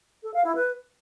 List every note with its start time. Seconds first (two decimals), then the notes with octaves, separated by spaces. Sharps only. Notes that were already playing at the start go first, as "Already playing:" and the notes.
0.23 A4
0.34 F5
0.44 E4
0.55 B4